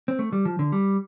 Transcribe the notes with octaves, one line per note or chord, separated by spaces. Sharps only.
C4
A3
G3
F3
D3
G3